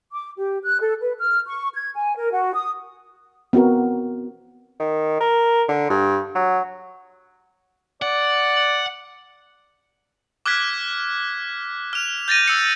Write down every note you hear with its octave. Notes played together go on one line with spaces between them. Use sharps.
D6
G4
F#6
A4
B4
F6
C#6
G#6
G#5
A#4
F#4
D#6
B3 C4 F#4 A#4
D#3
A#4
D3
G2
F#3
D5 F#5
D6 F6 F#6 G#6 B6
F6 F7
G6 A6 A#6 D#7
E6 C#7